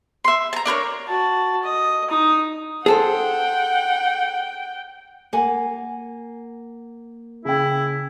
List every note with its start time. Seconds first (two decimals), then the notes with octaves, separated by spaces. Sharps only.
0.24 E5 C6
0.53 A5 A#5
0.65 D4 A#4 B4 C#5
1.08 F#4 A5
1.63 D#5
2.10 D#4 D#6
2.86 G#4 A4 C5 F#5 G5
5.33 A#3 F#5 G#5
7.45 C#3 E4 G5